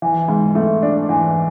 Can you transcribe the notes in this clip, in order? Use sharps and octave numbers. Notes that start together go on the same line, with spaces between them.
E3
G#2
A3
D4
E3